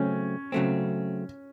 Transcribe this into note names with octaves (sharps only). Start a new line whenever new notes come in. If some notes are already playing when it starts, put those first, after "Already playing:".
Already playing: C#3 F#3 A3 C4 C#4
C#3 F#3 A3 C4